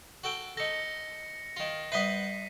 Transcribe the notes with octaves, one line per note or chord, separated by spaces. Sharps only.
F#4 A4 G5
D#4 A4 A#6 C#7
D#3 F4
G3 B4 C5 E5 F#5 B6 C7 D#7